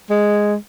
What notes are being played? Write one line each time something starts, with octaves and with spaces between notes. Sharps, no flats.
G#3